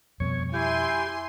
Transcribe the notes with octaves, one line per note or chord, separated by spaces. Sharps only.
F2 B2 G3 C#5
E4 G4 G#5 C6